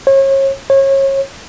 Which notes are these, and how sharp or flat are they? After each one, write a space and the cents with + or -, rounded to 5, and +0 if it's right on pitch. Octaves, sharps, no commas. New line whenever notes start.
C#5 -35
C#5 -30